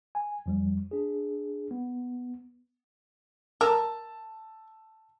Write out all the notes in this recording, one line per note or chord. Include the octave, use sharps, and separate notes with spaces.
G#5
F2 F3 G3
D4 G#4
B3
A#4 A5 E6